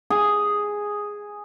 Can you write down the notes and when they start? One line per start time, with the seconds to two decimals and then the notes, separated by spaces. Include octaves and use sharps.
0.10 G#4